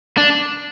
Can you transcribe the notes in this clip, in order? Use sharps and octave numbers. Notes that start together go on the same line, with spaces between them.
D4